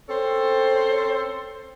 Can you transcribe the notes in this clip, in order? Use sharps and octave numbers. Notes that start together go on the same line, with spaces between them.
C4 C#4 A4 C5